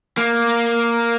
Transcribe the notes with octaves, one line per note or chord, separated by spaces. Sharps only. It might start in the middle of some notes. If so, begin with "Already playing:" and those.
A#3